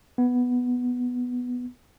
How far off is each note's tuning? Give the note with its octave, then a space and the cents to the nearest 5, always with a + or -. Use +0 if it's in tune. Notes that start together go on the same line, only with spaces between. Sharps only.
B3 +0